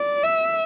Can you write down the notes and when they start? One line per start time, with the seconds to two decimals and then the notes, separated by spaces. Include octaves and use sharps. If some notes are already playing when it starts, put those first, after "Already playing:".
Already playing: D5
0.23 E5